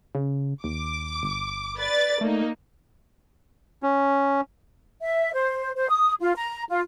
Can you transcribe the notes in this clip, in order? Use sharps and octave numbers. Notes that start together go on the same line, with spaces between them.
C#3
D#2 D6
G1
B4 D5 A6
A3 A#3 D#4
C#4
E5
C5
C5
D#6
F4
A#5
F4